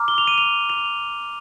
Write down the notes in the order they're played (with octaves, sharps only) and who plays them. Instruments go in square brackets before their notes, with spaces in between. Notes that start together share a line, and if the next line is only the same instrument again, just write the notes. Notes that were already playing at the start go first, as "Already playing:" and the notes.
Already playing: [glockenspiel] A#5 D6 F6
G7
F7
D#7
F7
F7